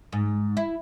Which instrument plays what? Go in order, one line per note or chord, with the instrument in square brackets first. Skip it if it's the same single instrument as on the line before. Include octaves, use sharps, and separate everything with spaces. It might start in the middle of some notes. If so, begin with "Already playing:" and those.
[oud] G#2
E4